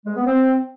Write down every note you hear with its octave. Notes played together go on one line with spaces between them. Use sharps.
G#3
B3
C4